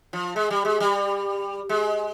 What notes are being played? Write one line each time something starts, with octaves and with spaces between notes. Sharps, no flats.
F3
G#3
G3
G#3
G3
G#3